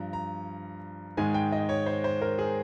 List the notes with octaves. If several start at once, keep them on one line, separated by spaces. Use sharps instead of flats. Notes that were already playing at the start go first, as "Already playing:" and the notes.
Already playing: G2 F3 A#5
A#5
G#2 D#3 G#3 G#5
G5
D#5
C#5
C5
C5
A#4
G#4